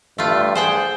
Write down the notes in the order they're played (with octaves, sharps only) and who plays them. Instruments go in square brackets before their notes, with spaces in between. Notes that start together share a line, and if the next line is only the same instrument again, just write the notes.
[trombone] G2 [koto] A3 F4
[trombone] G#4 [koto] C5 F#5 G5